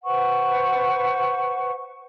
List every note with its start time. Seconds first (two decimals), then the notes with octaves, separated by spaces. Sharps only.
0.04 B4 C5 F#5 C#6